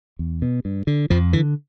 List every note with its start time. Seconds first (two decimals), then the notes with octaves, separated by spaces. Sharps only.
0.19 E2
0.42 B2
0.65 G2
0.87 D3
1.10 F2 F3
1.33 D3 E3